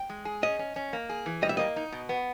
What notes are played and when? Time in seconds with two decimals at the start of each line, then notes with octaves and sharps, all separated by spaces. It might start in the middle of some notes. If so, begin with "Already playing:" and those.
Already playing: G5
0.10 G#3
0.25 G#4
0.42 C#4 D#5
0.59 C#4
0.76 C#4
0.93 A#3
1.09 G#4
1.26 E3
1.42 G3 D#5
1.49 E5
1.57 A#3 D#5
1.76 D#4
1.92 B2
2.09 B3